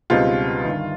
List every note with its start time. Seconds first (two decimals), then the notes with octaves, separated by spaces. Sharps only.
0.10 C#2 B2 G3 C4 D#4 F4
0.65 G1 G2 D#3